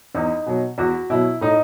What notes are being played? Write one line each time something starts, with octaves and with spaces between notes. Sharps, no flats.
E2 D#4
B2 F#3
E2 F#4
B2 F#3 E4
A2 D#4